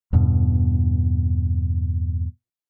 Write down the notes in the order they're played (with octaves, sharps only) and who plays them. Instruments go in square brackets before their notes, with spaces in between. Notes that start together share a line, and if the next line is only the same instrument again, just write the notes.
[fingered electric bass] E2 G2 B2